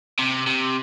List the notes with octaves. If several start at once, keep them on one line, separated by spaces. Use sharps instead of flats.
C3
C3